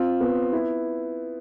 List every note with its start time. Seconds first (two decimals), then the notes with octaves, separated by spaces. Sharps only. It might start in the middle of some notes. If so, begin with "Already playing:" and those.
Already playing: C4 F4
0.21 B3
0.53 E4